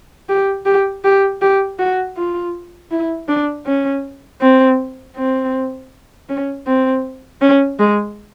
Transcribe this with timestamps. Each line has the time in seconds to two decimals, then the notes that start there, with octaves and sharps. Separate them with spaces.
0.29 G4
0.66 G4
1.04 G4
1.42 G4
1.79 F#4
2.16 F4
2.91 E4
3.28 D4
3.66 C#4
4.42 C4
5.17 C4
6.29 C#4
6.67 C4
7.42 C#4
7.79 G#3